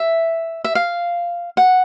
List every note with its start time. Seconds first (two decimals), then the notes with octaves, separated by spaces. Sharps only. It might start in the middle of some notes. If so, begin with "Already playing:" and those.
Already playing: E5
0.64 E5
0.75 F5
1.57 F#5